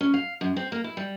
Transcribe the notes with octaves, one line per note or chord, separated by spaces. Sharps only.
C#4
F5
F#2
C4
A#3
E4
G3